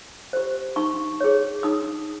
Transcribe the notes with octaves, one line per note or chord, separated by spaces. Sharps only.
G4 C5
D#4 C#6
G#4 C#5
D#4 D#6